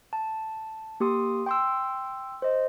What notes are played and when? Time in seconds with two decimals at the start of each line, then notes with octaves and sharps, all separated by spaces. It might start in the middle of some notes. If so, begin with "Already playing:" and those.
0.13 A5
1.00 A#3 G4 C6 D#6
1.46 G5 C6 E6
2.42 C5 D#5